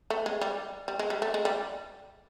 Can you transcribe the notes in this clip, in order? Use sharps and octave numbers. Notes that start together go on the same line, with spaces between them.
A3
G#3
G3
G3
G#3
G3
A3
G#3
G3